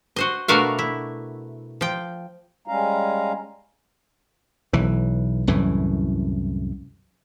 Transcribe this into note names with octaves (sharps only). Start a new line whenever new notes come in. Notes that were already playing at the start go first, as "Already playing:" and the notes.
F#4 C5 D#5
B2 A3 D4 F#4 A#4 F5
E4
F3 G5
G3 G#3 C#4 F5 A#5
B1 E3
C2 F#2 A2 E3